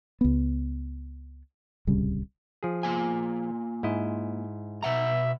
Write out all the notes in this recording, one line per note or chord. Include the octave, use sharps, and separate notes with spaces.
C#2 B3
D1 C2 C#3 G3
F3 G#4
A#3 F4 G#5
G#2 E4 D#5
B2 E5 F#5 A#5